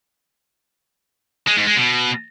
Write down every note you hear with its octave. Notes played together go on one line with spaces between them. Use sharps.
G#3
G#2
G#3
B2